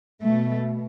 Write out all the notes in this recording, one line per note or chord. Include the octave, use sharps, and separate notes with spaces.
B2 A3